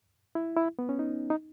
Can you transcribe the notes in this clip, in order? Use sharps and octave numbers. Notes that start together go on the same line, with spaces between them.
E4
E4
B3
C#4
D#4
D#4